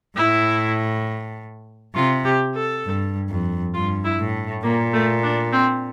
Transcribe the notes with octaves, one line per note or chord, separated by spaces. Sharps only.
A2 E4
C3 F4
G4
A4
G2
F2
G2 F4
E4
A2
A#2 A#3
A3
D4
C4